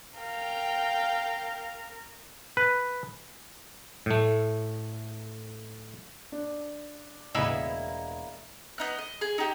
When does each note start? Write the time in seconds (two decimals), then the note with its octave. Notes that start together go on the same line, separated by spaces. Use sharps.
0.19 A#4 F5 G5
2.57 B4
4.06 A2 A3
6.32 D4
7.35 E1 A2 C#3 A#3 B3 E4 D#5 E6
8.78 B3 D#4 F#6
8.99 D#5
9.21 G#4
9.38 D#4 G4